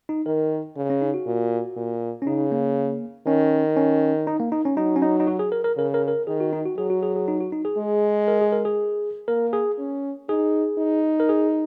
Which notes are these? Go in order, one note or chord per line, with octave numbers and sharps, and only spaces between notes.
D#4
D#3 A#4
C#3
C#4
D#4
F#4
A#2
A#2
C#4
C#3 D#4
A#3
D#3 C#4
C#4
D#4
A#3
D#4
C#4
F#3 D#4
C#4
D#4
D#4
F#4
G#4
A#4
A#4
C#3 A#4
A#4
A#4
D#3 G#4
F#4
D#4
F#4
F#3 G#4
F#4
G#4
G#4
D#4
F#4
D#4
G#4
G#3
A#4
G#4
A#4
G#4
A#3 A#4
G#4
C#4
D#4 G#4
D#4
A#4
G#4